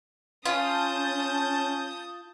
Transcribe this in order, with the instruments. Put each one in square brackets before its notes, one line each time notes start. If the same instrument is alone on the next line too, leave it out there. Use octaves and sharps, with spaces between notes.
[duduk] C#4 [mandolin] F4 [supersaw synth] A5 G6 [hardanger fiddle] D#6